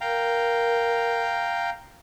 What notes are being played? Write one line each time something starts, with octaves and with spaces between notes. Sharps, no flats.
A#4 F5 G5 A#5